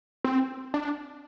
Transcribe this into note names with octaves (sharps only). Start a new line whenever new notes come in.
C4
D4